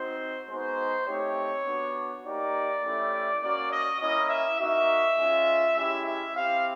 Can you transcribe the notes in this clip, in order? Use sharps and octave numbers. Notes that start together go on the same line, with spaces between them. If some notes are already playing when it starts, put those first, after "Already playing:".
Already playing: C4 D#4 F#4 C5
G#3 B3 D#4 F#4 C5
A3 C4 D#4 G4 C#5
B3 D4 F#4
A#3 D#4 G4 D5
A3 C#4 E4 G4
A#3 C#4 F#4 D5
D#5
A#3 C#4 E4 D#5
E5
A#3 D#4 F#4 E5
G#3 C#4 F4
G#3 C#4 E4 G4 E5
E5
C4 E4 G4 F5